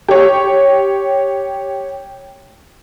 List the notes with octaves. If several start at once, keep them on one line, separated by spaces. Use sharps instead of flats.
G4 C#5